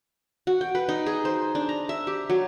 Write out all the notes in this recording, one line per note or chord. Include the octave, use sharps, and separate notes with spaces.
F#4
G5
B4
D#4
G#4
C5
D4
A#5
E5
G4
F#3